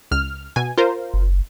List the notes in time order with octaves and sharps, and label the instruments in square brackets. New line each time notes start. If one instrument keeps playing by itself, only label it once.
[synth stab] C#2 F6
B2 G#5
F4 A#4 C5
[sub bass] F#1